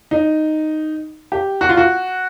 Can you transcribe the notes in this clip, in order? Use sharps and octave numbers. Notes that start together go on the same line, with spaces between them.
D#4
G4
F#4
F4
F#4